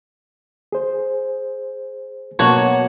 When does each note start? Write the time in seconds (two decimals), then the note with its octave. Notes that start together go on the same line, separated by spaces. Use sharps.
0.72 G#4 C5
2.39 B2 F#3 A#3 F#4 C#5 A5